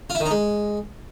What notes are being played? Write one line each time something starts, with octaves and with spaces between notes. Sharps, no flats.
F4
E4
D#3
D#4
G#3